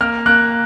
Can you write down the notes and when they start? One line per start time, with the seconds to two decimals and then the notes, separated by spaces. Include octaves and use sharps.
0.01 A#3 F6
0.26 A#3 F#6